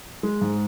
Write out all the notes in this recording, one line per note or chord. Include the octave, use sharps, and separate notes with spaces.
G#3
G#2